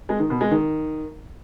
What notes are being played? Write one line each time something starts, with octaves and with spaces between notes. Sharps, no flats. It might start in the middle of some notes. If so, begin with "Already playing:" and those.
G#3
D#3
B2
G#3
D#3